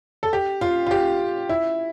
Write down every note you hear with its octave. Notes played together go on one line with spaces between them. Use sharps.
A4
G4
F4
F4
G4
E4